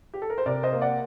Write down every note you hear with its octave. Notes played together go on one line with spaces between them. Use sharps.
G4
A4
A#4
C5
C3 A#4 D5
C5 D#5
A#3
D5 F#5